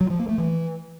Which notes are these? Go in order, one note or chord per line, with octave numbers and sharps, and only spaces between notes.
F#3
F3
A#3
A3
E3